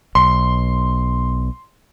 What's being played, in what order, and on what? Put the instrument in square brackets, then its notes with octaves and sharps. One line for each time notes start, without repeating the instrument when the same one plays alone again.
[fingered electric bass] B1 [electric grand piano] C6